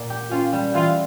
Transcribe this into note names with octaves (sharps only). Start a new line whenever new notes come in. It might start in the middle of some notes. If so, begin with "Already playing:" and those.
Already playing: A#2
G4
C#4 F4
G3
E3 F4